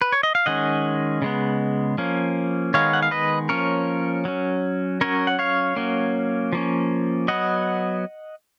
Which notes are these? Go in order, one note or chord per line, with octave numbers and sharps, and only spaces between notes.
B4
C#5
D#5
F5
D#3 G#3 C#4 D#5 F#5
C#3 G#3 B3
F3 A#3 C#4
D#3 G#3 B3 C#5 F5
F#5
F5
B4 D#5
F3 A#3 C#4 A#4 C#5
F#3 C#4
F#3 C#4 A#4 C#5
F#5
C#5 F5
F#3 A#3 C#4
F3 A#3 C#4
F#3 B3 D#5 F#5